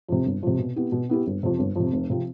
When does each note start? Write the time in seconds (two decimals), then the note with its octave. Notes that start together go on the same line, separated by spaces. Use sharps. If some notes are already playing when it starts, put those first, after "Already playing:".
0.08 F2 C3
0.26 G1
0.43 F2 C3
0.58 B2
0.76 B3 E4 G4
0.92 B2
1.09 B3 E4 G4
1.27 G1
1.43 F2 C3
1.59 G1
1.76 F2 C3
1.93 F1
2.10 C3 F3 C4